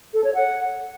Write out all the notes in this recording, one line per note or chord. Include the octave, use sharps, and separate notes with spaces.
A4
C#5
F#5